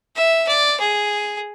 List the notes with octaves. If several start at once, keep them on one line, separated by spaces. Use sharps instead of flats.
E5
D5
G#4